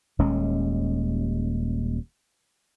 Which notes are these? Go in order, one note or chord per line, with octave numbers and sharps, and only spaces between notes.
D#1 D#2 G#3 C#4